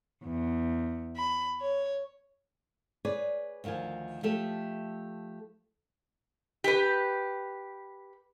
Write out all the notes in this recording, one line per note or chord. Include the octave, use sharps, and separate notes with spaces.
E2
B5
C#5
G#4 B4 C#5 D5
D2 D#3 F3 F5 G#5
F3 A3 G4 A4
G4 B4